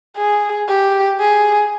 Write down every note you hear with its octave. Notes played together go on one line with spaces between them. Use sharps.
G#4
G4
G#4